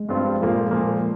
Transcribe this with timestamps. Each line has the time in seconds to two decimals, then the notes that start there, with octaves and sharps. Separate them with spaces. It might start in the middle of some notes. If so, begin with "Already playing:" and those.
Already playing: G#3
0.09 G2 F3 C4 F4
0.41 A#2 F3 A#3
0.71 A#2 F3 A#3